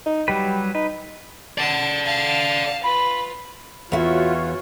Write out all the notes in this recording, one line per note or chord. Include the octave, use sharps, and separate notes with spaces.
D#4
F#3 G3 G4 B4
D#4 B4
D5 F#5 A5
F5 A5
F4 B4 B5
E2 F4 F#4 C#5 E5